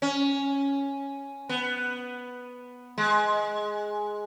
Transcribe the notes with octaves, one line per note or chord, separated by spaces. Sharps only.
C#4
B3
G#3